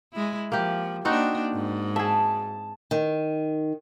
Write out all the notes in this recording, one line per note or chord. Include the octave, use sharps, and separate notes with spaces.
G#3 E4
F3 A#3 G4
A#3 C4 D4 D#4 F#4
G#2
G#4 E5 A5
D#3